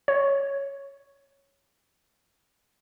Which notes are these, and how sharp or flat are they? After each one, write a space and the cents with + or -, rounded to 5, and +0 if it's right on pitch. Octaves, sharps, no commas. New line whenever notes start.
C#5 +0